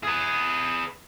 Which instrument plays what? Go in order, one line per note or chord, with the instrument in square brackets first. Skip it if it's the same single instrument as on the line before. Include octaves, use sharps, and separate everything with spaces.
[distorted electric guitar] G#4 B4